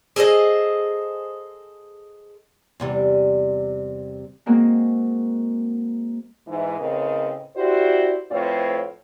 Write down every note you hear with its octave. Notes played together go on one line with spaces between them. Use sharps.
G#4 A4 C5 D#5
E2 C3 G3
G#3 A#3 C4 F#4
G#2 E3
A2 C#3 C4 A#4 B4 D#5
E4 F#4 G4 C5 D5
F2 A2 C4 F4 B4 C#5